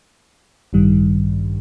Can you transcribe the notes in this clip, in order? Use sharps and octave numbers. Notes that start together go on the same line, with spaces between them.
A1 G2 D#3 G3